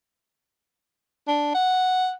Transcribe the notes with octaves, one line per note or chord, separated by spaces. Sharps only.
D4
F#5